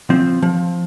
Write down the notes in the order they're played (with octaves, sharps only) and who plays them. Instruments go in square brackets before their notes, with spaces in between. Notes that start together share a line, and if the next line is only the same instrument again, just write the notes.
[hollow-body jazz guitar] F3 C4
F3